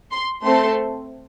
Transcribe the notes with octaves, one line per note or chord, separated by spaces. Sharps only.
C6
A3 C4 A4 C6